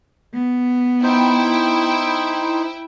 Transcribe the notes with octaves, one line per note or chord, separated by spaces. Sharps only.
B3
D#4 E4 C5 G5